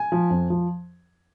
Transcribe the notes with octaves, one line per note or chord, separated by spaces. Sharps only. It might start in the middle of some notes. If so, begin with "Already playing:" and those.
Already playing: G#5
F3
F2
F3